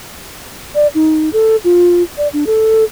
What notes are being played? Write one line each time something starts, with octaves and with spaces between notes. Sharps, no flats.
D5
D#4
A4
F4
D5
D4
A4